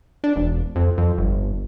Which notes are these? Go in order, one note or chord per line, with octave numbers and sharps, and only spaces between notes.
D4
E1
F2
F2
G1